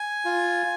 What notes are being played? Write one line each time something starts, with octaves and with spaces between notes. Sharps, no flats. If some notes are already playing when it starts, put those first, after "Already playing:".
Already playing: G#5
F4